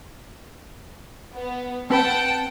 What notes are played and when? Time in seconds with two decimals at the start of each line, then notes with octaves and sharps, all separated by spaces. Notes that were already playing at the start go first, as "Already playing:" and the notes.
1.33 B3
1.90 C4 B4 F#5 G5 A5 B5